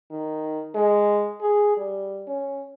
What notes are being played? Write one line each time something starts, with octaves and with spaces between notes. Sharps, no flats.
D#3
G#3
G#4
G3
C#4